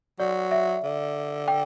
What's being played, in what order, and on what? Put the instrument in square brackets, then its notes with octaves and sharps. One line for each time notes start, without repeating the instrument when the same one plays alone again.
[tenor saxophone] F#3 [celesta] D5
[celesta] E5
[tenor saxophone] D3
[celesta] G5